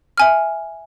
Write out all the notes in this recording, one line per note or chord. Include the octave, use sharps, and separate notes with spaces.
E5 G#5 F6